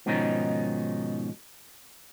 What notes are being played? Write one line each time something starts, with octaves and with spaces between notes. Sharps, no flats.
G#2 B2 D#3 F3 C#4 D#4